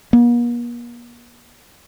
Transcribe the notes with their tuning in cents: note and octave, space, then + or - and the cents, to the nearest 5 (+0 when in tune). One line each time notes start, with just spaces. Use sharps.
A#3 +45